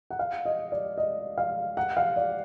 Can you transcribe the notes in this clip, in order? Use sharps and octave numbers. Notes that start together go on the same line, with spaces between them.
F#5
F5
D#5
D5
D#5
F5
F#5
F5
D5